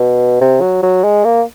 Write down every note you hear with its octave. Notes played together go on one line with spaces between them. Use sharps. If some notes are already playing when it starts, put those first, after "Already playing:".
Already playing: B2
C3
F#3
F#3
G#3
A#3